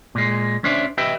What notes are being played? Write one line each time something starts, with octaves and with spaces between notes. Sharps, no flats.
A#2 G#3
C#4 D4 C5 D5 E5
G4 B4 D#5 E5 G5